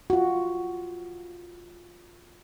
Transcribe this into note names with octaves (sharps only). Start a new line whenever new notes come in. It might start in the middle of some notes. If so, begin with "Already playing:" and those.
F4 F#4